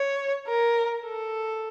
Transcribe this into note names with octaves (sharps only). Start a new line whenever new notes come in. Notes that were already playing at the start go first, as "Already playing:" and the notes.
Already playing: C#5
A#4
A4